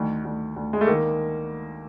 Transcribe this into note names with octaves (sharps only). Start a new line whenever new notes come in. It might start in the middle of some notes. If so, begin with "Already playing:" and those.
Already playing: D2 D#3
D2
D2
G#3
A3
D#3 A#3